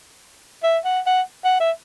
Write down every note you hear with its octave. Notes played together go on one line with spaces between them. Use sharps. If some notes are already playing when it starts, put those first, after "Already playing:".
E5
F#5
F#5
F#5
E5